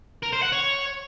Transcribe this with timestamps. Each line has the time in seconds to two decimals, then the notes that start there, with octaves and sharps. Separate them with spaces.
0.23 A#4
0.33 C5
0.42 F#5
0.52 C#5